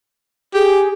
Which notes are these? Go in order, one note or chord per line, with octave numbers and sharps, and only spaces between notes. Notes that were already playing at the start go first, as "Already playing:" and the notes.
G4 G#4